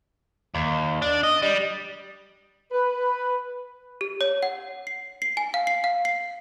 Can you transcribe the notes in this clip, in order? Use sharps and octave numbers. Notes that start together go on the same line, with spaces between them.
D#2
D4
D#5
G3
B4
G4
C#5
F#5
C7
C7
G#5
F5
C7
F5
C7